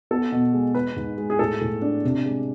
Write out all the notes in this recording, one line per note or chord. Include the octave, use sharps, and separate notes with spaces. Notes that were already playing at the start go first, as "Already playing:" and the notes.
B3 A4
B2
G#3
G#3 B4
G#2
G#3
G#4
A2 A4
A2
D4
C3
G#3